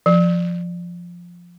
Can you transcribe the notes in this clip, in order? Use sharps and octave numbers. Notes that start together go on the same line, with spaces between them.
F3